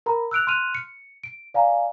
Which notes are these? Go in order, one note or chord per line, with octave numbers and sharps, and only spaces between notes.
A#4 A#5 B5
E6 F#6 D7 F7
C6 F6 F#6 D#7 F7
C#7
D7
D5 F5 G#5 A#5